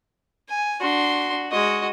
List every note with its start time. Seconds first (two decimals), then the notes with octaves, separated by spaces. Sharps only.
0.49 G#5
0.80 D4 F#4 C6
1.51 G#3 F#4 D#5 C#6